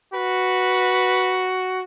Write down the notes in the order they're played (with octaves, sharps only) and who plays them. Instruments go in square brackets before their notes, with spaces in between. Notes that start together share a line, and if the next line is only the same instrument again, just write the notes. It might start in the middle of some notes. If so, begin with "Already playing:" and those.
[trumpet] F#4 [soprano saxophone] B4